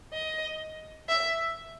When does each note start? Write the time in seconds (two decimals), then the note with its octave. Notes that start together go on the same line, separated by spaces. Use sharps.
0.13 D#5
1.09 E5